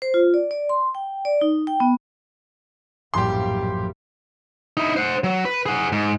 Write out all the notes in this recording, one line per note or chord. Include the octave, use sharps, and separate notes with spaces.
C5
F4
D5
D5
C6
G5
D5
D#4
G5
B3
A#1 F#2 A2 F3 G3 G4 C6
D#4 E4
C5 F#5
F#3
B4
G#4 F#5
G#2